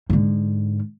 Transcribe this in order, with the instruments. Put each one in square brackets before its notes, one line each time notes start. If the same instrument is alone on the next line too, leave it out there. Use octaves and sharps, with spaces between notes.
[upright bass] G#2 D3